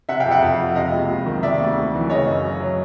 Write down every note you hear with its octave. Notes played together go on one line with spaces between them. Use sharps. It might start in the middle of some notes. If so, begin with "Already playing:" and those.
C3 E5 F#5
F5 G5
F2
E5 F#5
F2
F3
C3 D#5 F5
C#2
C#2
D#3
C3 D5 E5
D2
D2
E3
C#3 C#5 D#5
F#2
F#2
F#3